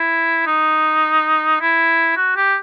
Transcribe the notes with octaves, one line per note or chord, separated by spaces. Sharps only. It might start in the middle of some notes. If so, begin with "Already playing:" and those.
Already playing: E4
D#4
E4
F#4
G4